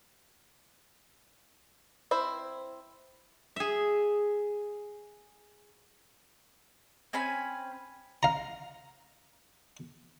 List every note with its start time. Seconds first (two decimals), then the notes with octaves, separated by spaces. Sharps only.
2.11 C4 E4 C5
3.56 G#4 E5
7.13 C4 C#4 G#5 B5
8.23 F5 A#5